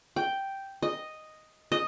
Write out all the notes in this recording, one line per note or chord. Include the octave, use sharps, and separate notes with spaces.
G5
D#5
D#5